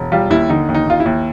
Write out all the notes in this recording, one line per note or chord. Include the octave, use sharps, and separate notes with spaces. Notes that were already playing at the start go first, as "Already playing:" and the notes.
Already playing: E1
G3 F4
D#2 E4
D3 D#4
D#2
D#4
D#2 F4
E4
D#2